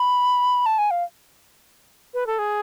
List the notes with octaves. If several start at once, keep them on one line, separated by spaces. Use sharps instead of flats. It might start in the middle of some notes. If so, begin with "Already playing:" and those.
Already playing: B5
A5
G#5
F5
B4
A4
G#4